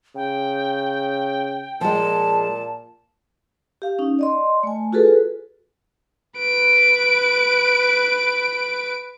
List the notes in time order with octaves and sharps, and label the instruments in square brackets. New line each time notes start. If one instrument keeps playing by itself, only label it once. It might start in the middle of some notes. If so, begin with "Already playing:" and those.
[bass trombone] C#3 [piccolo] G5
[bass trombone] A#2 [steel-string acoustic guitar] F3 G#3 [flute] A5
[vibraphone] G4 F5
C#4 D#4
D5 D#5 C6
A3 G#5
F4 F#4 G#4 A4 B4
[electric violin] B4 D7